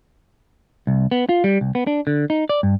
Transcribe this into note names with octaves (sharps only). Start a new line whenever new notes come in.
C2
B3
F4
G3
C2
B3
D4
D3
D#4
D5
G2